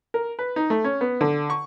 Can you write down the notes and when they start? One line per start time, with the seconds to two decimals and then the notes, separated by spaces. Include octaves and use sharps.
0.14 A#4
0.39 B4
0.56 D#4
0.70 A3
0.84 C#4
1.01 B3
1.21 D3
1.50 C#6